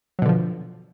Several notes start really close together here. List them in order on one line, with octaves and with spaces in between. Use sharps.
F#3 B2 D3 F3